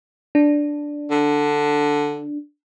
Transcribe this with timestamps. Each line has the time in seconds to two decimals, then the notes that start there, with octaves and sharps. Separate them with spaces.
0.35 D4
1.11 D3